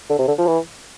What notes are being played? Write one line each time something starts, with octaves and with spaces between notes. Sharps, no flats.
D3
C3
D3
F3
E3